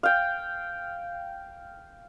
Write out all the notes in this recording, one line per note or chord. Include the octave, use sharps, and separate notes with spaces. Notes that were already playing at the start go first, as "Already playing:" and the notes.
F5 G5